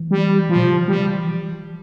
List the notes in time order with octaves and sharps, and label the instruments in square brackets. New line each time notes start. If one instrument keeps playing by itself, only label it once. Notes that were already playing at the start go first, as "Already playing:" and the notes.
Already playing: [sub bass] E3
[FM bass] G3
F3
[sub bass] A#2
C3
C#3
E3
[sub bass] F3 [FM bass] G3
[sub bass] E3